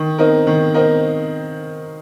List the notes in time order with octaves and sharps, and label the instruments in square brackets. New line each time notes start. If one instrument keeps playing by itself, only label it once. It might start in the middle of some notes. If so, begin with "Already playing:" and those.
Already playing: [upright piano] D#3
C4 D#4 A#4
D#3
C4 D#4 A#4